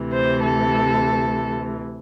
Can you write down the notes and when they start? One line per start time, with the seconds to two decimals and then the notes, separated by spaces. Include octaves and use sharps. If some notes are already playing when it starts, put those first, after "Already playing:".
Already playing: D2 C3 E3
0.12 C5
0.42 A4